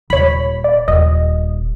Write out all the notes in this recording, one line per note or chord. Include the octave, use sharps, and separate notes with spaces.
D#1 C#5 B5
D5
D#1 D#5